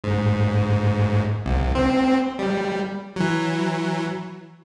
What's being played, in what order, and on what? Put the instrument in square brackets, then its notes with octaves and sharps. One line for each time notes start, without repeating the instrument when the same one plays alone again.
[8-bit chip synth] G#2
C2
C4
G3
E3 F#3